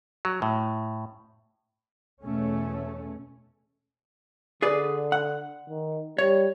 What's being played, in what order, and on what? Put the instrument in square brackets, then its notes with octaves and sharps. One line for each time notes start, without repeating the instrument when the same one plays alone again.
[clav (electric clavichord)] F#3
A2
[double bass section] E2 B2 A3 C#4
[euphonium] D3 [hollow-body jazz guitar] G#4 B4 D5
[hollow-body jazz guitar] F#5
[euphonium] D#3
[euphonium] G3 [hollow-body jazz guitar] C#5